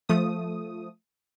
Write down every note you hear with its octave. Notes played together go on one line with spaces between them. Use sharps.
F3 A3 D#6